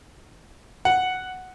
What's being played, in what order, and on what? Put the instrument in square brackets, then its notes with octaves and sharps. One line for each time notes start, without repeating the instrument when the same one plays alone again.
[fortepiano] F#5